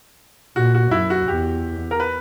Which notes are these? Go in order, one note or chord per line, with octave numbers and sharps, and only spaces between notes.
A#2 F#4
F#4
F#2 E4
F#4
E2 G4
A#4
B4